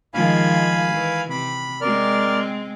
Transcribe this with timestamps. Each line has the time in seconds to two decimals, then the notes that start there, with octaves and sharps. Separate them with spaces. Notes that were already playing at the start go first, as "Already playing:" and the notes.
0.14 D#3 F3 G#3 F5 G#5 B5
0.93 E3
1.30 C3 B5
1.81 G#3 C4 A#4 D5 F6